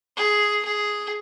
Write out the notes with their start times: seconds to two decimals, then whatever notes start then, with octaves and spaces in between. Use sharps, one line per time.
0.17 G#4
0.65 G#4